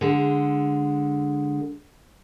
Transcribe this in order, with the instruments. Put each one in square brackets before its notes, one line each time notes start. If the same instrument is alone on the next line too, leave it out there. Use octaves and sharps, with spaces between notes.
[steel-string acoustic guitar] D3 G#3